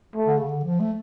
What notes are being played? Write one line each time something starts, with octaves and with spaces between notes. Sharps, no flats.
A3
D3
C#3
D3
F3
A3